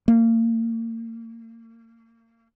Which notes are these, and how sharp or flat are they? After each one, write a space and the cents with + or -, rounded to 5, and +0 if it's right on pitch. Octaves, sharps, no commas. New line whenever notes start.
A#3 -35